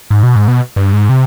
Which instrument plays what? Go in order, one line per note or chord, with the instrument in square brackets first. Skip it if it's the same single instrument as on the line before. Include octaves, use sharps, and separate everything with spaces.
[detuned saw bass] G#2
B2
G#2
B2
G2
G#2
C3